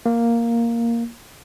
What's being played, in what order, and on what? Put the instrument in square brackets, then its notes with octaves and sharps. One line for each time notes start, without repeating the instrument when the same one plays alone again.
[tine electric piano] A#3